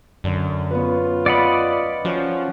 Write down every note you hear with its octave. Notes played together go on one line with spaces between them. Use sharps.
F#2 D3
B3 C#4 F4 B4
D5 D#5 F#5 B5 D#6
F3 C#4 F#4